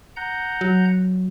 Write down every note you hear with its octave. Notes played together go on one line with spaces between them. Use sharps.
F#5 A#5 G6
F#3